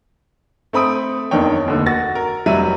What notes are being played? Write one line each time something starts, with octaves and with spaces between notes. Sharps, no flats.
A3 C4 B5 D#6 D7
F#1 E2 D#3 D4 C#5 G5
F1 D#2 D3
F#4 A6 A#6
A#4
F1 F#3 G3 E5 D#7